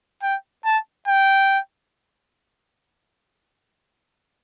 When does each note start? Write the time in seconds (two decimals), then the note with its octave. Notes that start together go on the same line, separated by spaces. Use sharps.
0.22 G5
0.65 A5
1.08 G5